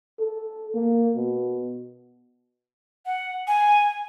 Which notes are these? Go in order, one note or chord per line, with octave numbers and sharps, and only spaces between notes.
A4
A#3
B2
F#5
G#5